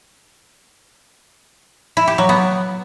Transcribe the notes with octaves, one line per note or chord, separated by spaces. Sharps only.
E4
G4
F#3
B3